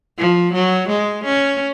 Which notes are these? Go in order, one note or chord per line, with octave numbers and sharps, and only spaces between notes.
F3
F#3
G#3
C#4